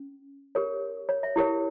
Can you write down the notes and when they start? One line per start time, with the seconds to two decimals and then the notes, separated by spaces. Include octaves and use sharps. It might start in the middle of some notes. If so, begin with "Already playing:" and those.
Already playing: C#4
0.55 G4 A#4 C#5
1.09 C#5
1.23 E5
1.36 E4 G4 A#4 C#5